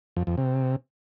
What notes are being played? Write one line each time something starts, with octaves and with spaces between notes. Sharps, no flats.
F2
F2
C3